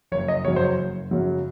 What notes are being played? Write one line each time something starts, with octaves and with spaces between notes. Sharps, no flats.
F#1 C#5
D#5
F#2 C#3 F#3 C#5
C5
C#5
F#1
F#2 C#3 F#3